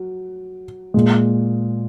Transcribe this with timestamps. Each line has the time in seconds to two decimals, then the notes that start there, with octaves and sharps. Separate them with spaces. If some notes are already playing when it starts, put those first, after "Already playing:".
Already playing: F#3
0.94 A#2 G#3